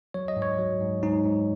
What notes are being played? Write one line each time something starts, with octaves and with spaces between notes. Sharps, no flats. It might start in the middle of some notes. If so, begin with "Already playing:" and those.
F#3 C#5
D#5
G#2
C#5
F#3
G#2
G#2 D#4
G#2